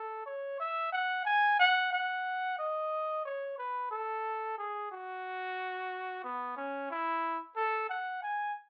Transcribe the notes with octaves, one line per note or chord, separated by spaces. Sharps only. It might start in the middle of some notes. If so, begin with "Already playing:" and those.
Already playing: A4
C#5
E5
F#5
G#5
F#5
F#5
D#5
C#5
B4
A4
G#4
F#4
B3
C#4
E4
A4
F#5
G#5